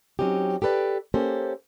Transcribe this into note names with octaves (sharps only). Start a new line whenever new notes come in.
F#3 C4 C#4 D#4 G4
G4 A4 B4 D5
A#3 C#4 G4 A4 C5